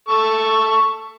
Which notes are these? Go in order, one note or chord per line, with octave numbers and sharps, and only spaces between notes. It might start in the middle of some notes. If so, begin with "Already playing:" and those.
A4 C#6